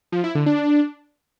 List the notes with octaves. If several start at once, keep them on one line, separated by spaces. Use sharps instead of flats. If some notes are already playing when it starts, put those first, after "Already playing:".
F3
E4
D3
D4